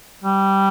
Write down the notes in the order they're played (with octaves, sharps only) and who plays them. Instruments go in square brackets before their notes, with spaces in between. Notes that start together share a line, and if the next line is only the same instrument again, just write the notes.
[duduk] G3